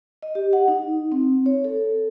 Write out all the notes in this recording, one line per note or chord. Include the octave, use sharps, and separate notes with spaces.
D#5
G4
F#5
D#4
C4
C#5
A4